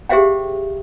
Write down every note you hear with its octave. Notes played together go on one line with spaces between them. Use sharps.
G4 G#4 C5 E5 F5 G5